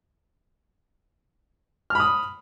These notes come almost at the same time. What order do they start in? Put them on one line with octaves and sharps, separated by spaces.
F6 B5 D#6